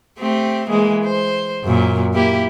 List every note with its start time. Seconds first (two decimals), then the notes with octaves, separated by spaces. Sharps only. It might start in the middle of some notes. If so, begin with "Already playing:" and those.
0.19 A3 C4 G4
0.68 E3 G#3 A#3
1.04 C5
1.64 F#2 A#2
2.14 A#3 E4 G4